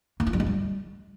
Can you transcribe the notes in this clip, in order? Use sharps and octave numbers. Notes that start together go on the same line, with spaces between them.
A#3
F4
G3
G#3
G3